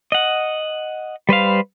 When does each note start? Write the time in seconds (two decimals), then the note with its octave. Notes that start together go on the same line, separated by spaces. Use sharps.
0.12 D#5 F#5
1.29 G3 B4 C5 F5